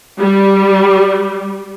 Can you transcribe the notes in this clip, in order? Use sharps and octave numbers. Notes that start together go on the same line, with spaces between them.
G3